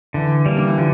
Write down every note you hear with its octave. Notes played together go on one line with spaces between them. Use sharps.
D3 E3
G3 A#3
D3
E3
D3 F3